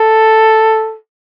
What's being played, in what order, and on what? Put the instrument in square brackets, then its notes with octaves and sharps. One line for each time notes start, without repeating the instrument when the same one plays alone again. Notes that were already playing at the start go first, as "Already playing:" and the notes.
Already playing: [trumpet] A4